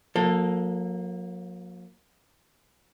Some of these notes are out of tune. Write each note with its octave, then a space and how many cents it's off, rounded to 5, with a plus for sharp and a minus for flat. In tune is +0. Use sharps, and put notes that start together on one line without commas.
F#3 -45 A#3 +0 A4 +10